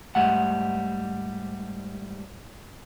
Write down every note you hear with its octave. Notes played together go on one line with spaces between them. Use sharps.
G#2 G3 A3 F#5